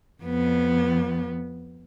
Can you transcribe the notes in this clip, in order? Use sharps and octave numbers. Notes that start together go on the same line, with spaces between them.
F2 B3